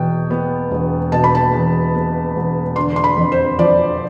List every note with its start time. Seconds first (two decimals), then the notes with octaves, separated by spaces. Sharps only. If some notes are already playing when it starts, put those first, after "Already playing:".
Already playing: E2 B2 G5
0.30 B3
0.71 E1
1.12 B2 A5
1.24 B5
1.35 A5
1.53 E2
1.95 B3
2.36 E1
2.76 D3 C6
2.96 C6
3.04 B5
3.17 F2
3.32 C5
3.59 F3 D5